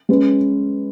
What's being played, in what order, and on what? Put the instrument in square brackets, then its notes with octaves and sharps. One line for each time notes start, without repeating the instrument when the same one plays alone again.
[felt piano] G#3 C#4 B4